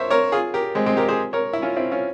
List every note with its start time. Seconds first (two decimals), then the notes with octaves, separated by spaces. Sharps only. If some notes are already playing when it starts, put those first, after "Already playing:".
Already playing: A#4 C5 C#5 E5
0.10 A#4 C#5
0.32 F4 G#4
0.54 G4 A#4
0.75 G#3 C4
0.86 G#3 C4
0.97 G4 A#4
1.09 G#4 C5
1.33 A#4 C#5
1.53 E4
1.62 C#4 F4
1.76 C4 E4
1.91 C#4 F4